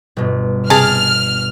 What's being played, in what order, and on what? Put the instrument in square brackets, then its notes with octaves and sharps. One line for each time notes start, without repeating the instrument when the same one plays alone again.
[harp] G1 B2
[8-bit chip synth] C3 G#4 G#5 [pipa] A5 [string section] F6